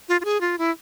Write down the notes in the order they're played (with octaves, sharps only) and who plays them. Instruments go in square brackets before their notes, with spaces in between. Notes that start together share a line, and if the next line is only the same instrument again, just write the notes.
[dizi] F4
F4
G#4
F4
E4